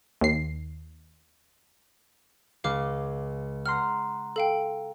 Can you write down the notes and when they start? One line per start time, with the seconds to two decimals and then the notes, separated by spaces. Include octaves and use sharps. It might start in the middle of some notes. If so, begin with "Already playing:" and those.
0.21 D#2 C7
2.64 C#2 F5 D6 F6
3.66 F#5 A#5 C6 F6
4.36 A4 F5 G5